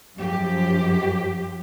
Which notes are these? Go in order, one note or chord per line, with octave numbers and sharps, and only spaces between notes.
F#2 F3 G4